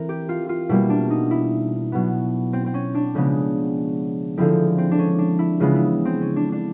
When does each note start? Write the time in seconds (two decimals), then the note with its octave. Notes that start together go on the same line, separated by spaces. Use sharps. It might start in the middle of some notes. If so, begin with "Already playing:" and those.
Already playing: E3 C4 A#4
0.09 G4
0.29 F4
0.49 F4
0.69 B2 G3 A#3 E4
0.90 D4
1.10 D#4
1.31 E4
1.92 B2 F#3 B3
2.53 C4
2.66 C4
2.74 C#4
2.95 D4
3.15 C#3 F3 G#3 B3
4.38 D3 F3 G#3 C4 E4
4.78 C4
4.91 D4
4.99 C#4
5.19 D4
5.39 E4
5.60 C#3 E3 G#3 B3 F4
5.75 E4
6.05 C4
6.21 C#4
6.36 D4
6.52 D4